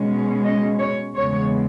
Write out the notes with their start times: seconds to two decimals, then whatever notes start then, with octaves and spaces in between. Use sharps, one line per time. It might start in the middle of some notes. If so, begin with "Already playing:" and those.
Already playing: B2 G#3 C#4
0.45 D#5
0.79 C#5
1.14 E2 C#3 G#3 B3 C#5